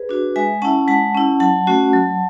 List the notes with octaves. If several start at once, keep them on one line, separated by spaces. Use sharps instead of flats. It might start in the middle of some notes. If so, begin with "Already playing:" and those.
Already playing: G#4 B4
D4 F#4
G#3 E5 G#5
C#4 E4 F#5 A5
G#3 F#5 A5
C#4 E4
F#3 F#5 A5
A3 C#4 F#4
F#3